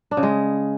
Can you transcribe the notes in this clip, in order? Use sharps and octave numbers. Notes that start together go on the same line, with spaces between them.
D4
C#3
G#3